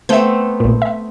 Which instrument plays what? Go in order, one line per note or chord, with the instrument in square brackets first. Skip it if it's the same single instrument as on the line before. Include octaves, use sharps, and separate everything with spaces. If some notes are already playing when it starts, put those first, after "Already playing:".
[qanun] A3 B3 C4 [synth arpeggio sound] E5 G6
[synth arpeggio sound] B1 A#2
E5